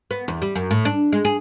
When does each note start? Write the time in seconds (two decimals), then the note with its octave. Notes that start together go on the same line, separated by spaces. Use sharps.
0.11 B3
0.28 E2
0.42 G3
0.55 F#2
0.71 A2
0.85 D4
1.13 G#3
1.25 G#4